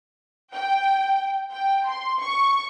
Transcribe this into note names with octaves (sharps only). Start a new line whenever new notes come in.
G5
G5
C6
C#6